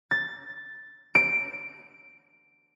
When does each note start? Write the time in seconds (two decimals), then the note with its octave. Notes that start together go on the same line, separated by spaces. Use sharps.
0.11 A6
1.15 D7